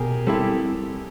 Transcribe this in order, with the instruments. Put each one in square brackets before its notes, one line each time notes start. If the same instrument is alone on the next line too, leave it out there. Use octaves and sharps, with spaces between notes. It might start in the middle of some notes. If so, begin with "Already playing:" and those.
Already playing: [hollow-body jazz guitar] B2 [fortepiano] G4 G#4 A#4
[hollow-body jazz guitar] G3 C4 E4 [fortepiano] G4 A4